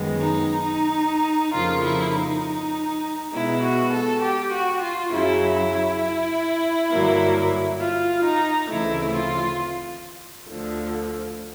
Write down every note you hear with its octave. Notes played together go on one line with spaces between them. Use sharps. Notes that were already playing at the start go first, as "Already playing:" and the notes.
Already playing: F#2 D#3 G#3 B3
D#4
D#4
F2 C#3 F3 A#3 F4
E4
D#4
B2 G#3 B3 E4
F#4
A4
G4
F#4
F4
F#2 C#3 F#3 E4
E4
G2 D3 F#3 A#3
F4
D#4
D2 C#3 E3 A3 C4 E4
F4
D2 D3 F3